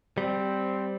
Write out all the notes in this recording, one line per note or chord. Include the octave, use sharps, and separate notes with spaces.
G3 C4